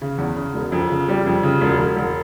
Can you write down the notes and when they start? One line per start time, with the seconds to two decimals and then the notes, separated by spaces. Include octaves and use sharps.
0.01 C#3
0.18 E2
0.36 C#3
0.54 E1
0.72 F2
0.90 C#3
1.08 G3
1.26 F2
1.43 C#3
1.61 E1
1.79 E1
1.96 E1